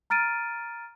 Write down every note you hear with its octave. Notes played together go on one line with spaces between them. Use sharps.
A#5 F6 A6 D7 D#7